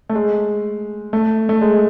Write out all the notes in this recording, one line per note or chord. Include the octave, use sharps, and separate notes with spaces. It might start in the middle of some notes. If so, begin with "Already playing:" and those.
A3
G#3
A3
A3
G#3